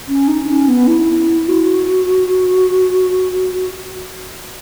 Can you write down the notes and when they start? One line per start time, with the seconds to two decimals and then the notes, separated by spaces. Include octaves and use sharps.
0.08 C#4
0.28 D#4
0.48 C#4
0.68 B3
0.87 E4
1.49 F#4